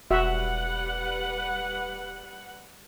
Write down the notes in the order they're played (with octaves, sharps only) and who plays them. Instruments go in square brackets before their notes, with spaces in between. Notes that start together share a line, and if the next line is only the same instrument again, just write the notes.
[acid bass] E1 [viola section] G3 B4 F#5 [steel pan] F#4 E5